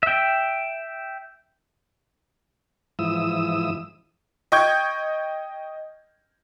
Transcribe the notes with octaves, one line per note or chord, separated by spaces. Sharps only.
E5 G5
G#2 E3 F3 E4 D#6 E6
D#5 G5 C#6 G6 G#6